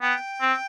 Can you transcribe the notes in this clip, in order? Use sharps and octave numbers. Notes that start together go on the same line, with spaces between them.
B3 G5
C4